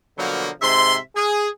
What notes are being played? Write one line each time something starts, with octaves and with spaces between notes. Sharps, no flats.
B2 D3 F3 F#3 A#3
G#2 C3 E5 C6
G#4